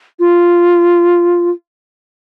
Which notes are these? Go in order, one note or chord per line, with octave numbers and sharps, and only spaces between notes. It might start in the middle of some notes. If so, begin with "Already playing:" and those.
F4